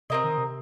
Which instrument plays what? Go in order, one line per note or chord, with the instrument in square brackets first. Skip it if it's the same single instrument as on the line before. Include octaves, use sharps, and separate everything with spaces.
[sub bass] C3 [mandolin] C4 D#4 A#4 D#5
[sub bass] D#3
C3